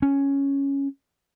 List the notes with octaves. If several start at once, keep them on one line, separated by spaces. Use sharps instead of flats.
C#4